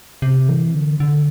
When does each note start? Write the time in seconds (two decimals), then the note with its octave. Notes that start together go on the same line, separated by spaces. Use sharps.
0.22 C3
0.48 E3
0.74 D3
1.00 D3